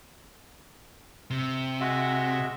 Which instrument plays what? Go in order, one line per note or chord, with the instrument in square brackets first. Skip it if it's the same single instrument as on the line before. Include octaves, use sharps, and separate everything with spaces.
[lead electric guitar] C3
[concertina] G#3 F#4 E5